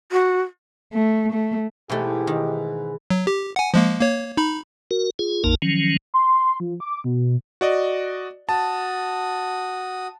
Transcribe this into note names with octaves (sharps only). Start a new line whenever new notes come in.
F#4
A3
A3
G#2 B2 E3 A3 G4
D#3
F#3
G4
F#5 G#5
F3 G#3 A#3
A#3 C#5
D#4 B5
F#4 A#4
F4 G#4
A#1 F2 A#3 D#4 A#4 A5
D#3 F3 F#3 C#4
C6
F3
D6
B2
F#4 D5 D#5
F#4 A5 D#6